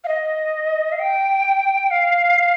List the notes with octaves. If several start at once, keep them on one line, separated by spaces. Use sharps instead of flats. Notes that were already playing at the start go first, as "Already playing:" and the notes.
F5
D#5
F5
G5
F5